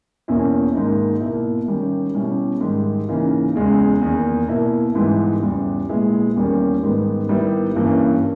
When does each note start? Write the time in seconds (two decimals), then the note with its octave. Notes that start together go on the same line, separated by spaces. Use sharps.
0.28 E2 B2 A#3 C#4 E4
0.75 G#2 D#3 A#3 D#4
1.21 B2 A#3 E4
1.68 D#3 G3 C#4
2.15 B2 G3 C#4 E4
2.61 G#2 D#3 G3
3.09 C#3 E3 A#3 D#4
3.55 E2 C#3 G#3
4.01 E2 D#3 A#3
4.48 B2 A#3 E4
4.95 G#2 E3 G3 B3 E4
5.42 E2 C#3 G3
5.89 A#2 G#3 B3 E4
6.36 E2 D#3 G3 A#3 C#4
6.83 G#2 D#3 G3 B3
7.29 D#3 G3 B3 E4
7.76 G2 E3 A#3 C#4